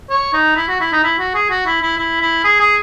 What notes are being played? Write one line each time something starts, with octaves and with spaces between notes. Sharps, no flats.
C#5
D#4
E4
F#4
E4
D#4
E4
F#4
G#4
F#4
E4
E4
E4
E4
G#4
G#4